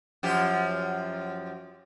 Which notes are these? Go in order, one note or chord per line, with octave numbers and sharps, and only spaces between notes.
F#2 F3 G4